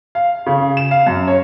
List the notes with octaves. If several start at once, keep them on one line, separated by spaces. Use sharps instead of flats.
F5
C#3
E7
F5
F#2
C#5